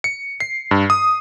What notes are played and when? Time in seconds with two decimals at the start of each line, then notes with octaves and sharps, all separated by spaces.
0.04 C#7
0.40 C7
0.71 G2
0.90 D#6